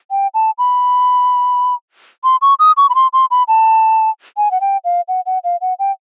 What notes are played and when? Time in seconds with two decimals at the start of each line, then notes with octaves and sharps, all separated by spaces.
0.11 G5
0.34 A5
0.58 B5
2.24 C6
2.42 C#6
2.59 D#6
2.77 C#6
2.89 B5
2.95 C6
3.13 C6
3.31 B5
3.48 A5
4.37 G#5
4.51 F#5
4.61 G5
4.85 F5
5.08 F#5
5.26 F#5
5.44 F5
5.61 F#5
5.79 G5